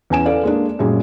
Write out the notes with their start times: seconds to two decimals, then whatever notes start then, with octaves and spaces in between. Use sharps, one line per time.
0.10 E2 C#4 G#5 E7
0.26 A4 B4 D5 F5
0.43 G#3 A#3 D4
0.79 F#2 A#2 G3 G#3